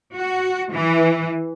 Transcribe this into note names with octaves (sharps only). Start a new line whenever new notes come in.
F#4
E3